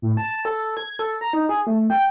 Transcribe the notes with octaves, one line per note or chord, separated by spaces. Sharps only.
A2
A5
A4
G#6
A4
A#5
D#4
G#4
A3
G5